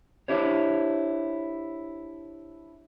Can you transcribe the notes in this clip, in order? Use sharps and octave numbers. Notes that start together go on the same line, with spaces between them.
D4 E4 G4 C5 C#5